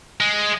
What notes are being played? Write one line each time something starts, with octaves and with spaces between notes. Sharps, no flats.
G#3